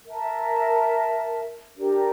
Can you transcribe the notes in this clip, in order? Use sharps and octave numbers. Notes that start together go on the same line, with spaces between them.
A#4 E5 A5
D4 G4 A#4 D5